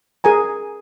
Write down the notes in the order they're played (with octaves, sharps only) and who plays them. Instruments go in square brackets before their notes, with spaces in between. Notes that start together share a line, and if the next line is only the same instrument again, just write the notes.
[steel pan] G#4 A#4 G#5 A#5